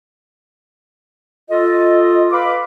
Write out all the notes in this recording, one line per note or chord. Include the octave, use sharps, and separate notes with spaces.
F4 A4 D#5
B4 F5 B5 D6